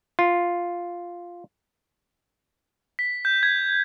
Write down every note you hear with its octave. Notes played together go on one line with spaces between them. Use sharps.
F4
B6
G6
G#6